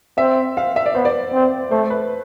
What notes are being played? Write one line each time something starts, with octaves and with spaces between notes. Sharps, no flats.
C4 E5
F5
E5
D5
B3 C5
D5
C4
A3 C5
B4